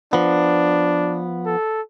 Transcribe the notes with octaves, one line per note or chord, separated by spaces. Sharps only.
F3 B3 D4
A4